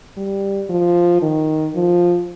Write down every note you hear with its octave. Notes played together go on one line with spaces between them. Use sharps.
G3
F3
D#3
F3